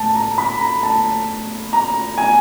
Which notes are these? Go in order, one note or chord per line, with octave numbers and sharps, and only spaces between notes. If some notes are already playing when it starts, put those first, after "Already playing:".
Already playing: A2 A5
A#5
B5
A#5
A5
A#5
G#5